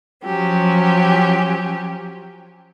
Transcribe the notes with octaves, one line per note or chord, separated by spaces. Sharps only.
F3 F#3 C#4 G4